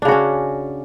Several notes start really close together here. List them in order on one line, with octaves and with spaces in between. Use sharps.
D4 C#3 F#4 C#4